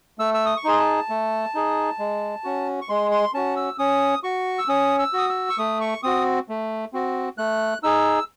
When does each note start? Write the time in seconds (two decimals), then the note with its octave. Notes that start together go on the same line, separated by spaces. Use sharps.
0.19 A3 E6
0.34 E6
0.46 D#6
0.57 C#6
0.64 D#4 G#4 C6
0.79 A5
1.09 A3
1.55 D#4 G#4
1.99 G#3
2.44 C#4 F#4
2.81 C#6
2.89 G#3 C6
3.11 C6
3.34 C#4 F#4 A5
3.56 E6
3.79 C#4 D#6
4.23 F#4 C#6
4.58 E6
4.68 C#4 D#6
4.99 E6
5.13 F#4 D#6
5.29 E6
5.50 C#6
5.58 A3 D#6
5.81 C#6
6.03 C4 F#4 D#6
6.49 A3
6.93 C4 F#4
7.38 A3 F#6
7.83 D#4 G#4 E6